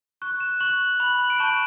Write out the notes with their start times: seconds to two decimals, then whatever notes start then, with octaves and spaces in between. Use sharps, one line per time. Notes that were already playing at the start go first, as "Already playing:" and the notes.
0.22 C#6 F#6
0.40 E7
0.61 C#6 F#6 F#7
1.00 B5 F#6 F#7
1.20 F#7
1.30 D7
1.39 A5 C#6 G6 E7